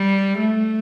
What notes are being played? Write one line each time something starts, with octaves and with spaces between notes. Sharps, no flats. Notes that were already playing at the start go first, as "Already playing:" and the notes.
Already playing: G3
A3